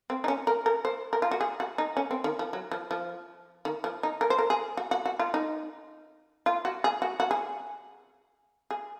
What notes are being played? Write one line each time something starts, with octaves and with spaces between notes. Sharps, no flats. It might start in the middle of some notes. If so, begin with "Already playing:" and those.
C4
D#4
C#4
A#4
A#4
C5
A#4
F4
F#4
G#4
F#4
D#4
C#4
C4
D#3
F3
F#3
F3
F3
D#3
F3
D#4
A#4
C5
A#4
G#4
F#4
F#4
F#4
F4
D#4
F4
F#4
G#4
F#4
F#4
G#4
G#4